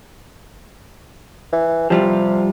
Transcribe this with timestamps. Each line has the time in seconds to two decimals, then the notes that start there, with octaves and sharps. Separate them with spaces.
1.53 E3
1.90 C3 F3 G3 F4